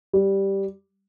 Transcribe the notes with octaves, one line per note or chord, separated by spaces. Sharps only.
G3